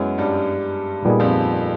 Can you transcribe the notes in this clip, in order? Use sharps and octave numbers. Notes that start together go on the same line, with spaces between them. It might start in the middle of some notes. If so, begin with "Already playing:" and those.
Already playing: F#2 F#3 G#3 B3 E4
G2 G3
A#2 G3 B3 D#4 G#4
F2 F3